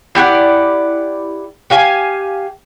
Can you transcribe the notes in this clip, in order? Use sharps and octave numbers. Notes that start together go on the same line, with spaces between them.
E4 G4 D5 F#5
G4 F5 G#5